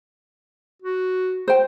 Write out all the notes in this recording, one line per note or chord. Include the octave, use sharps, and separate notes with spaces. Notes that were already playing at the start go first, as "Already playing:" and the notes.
F#4
C5 G5